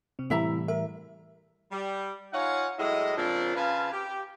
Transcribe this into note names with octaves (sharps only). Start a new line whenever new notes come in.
C3 C4
A2 E3 G3 E4 E5 A#5
A#4 E5
G3
D#4 F4 C#5 F5 F#5 G#5
A2 F#3 G#3 E4 D#5
A#2 C#3 F3 C4 D4
C#3 F4 B4 F5 G#5 A5
G4